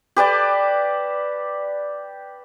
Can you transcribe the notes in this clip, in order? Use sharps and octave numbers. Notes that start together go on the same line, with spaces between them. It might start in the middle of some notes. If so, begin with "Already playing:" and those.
G4 B4 D5 A5